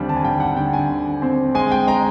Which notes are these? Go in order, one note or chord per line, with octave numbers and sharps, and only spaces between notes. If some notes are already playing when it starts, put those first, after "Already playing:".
Already playing: D#2 D3 G3 C4
A5
G#5
D#2 G5
F#5
D3 G5
G#5
D3
C4
G#3 G#5
G5
G#3 A#5